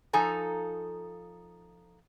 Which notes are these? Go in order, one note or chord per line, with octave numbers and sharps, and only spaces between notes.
F3 D#4 A4 G#5 A#5